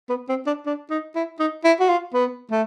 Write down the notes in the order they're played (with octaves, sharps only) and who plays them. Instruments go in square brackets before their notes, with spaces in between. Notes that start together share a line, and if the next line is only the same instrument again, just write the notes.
[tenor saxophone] B3
C4
D4
D4
D#4
E4
D#4
E4
F#4
F4
B3
A3